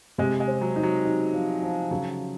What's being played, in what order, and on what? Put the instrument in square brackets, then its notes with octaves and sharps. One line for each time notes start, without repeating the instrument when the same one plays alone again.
[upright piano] C3 [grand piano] G#3
[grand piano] G#3
[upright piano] C4
[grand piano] F#3
[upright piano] D#4
[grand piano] F#3
[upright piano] D#4
F3
F3
[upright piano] C#3 [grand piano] F#3